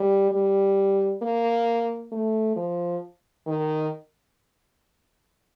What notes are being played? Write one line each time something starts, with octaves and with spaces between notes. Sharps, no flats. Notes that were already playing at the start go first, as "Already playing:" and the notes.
Already playing: G3
G3
A#3
A3
F3
D#3